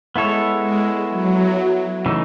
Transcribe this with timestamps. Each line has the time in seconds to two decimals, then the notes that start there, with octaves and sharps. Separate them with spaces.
0.16 G#3 B3 E4 A4 C#5
0.62 G#3
1.11 F#3
2.06 C#3 E3 A3 D#4